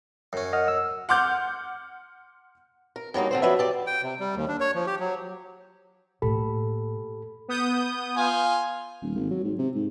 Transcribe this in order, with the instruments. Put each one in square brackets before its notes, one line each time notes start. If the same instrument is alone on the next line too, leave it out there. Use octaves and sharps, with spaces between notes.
[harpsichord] F#2 C#4
[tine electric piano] D#5 F#5 F6
E6
[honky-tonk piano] F#5 C6 D6 F6 G6
[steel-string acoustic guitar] A#4
G2 F#3 A#3 D#4
D3 C4 C5
F3 F#3 B4 D5 E5
G4 D5
[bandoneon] G5
C3
G3
D#2
D4
C#5
F3
G4
F#3
[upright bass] A2 A#3 [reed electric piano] G4 A4 B5
[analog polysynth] B3 D#6 G6
[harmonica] F4 G#5
[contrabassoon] D#1
G#1
F#3
G#2
C3
G#2